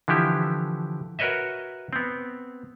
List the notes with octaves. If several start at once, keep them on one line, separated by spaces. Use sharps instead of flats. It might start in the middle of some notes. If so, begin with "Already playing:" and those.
D3 E3 F3 E4 G4
F#4 A#4 B4 C#5 D#5 E5
B3 C4